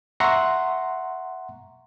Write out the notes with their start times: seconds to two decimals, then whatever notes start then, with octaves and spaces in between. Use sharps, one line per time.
0.20 E5 F#5 A#5 C6 C#6